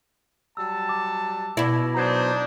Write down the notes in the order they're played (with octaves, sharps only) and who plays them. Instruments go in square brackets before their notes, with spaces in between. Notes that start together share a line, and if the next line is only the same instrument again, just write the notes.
[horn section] F#3 G3 A5 [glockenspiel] E6
[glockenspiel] D6
[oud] B2 E4 [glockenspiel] D6 G#6 A#6
[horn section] F#3 C5 [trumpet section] D4 D#4 [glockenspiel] A#5 G6 G#6